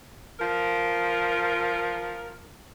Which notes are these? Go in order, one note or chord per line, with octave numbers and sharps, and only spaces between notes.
F3 A#4